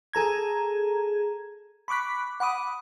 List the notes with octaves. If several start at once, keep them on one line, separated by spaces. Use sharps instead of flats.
G#4 A4 A#5 G#6
B5 C#6 D6 F#6 B6
F#5 B5 D6 D#6